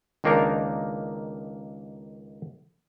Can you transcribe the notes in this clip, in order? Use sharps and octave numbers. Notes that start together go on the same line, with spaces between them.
C#2 D#3 A#3 D4 D#4 A#4